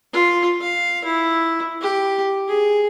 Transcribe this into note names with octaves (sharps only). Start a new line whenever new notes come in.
F4
F5
E4
G4
G#4